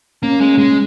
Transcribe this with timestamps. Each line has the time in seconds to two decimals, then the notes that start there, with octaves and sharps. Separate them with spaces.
0.23 A#3 C#4
0.41 G#3
0.58 G#3